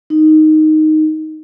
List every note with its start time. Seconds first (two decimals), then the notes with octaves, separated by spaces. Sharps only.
0.10 D#4